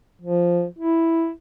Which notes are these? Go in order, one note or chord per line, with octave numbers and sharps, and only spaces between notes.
F3
E4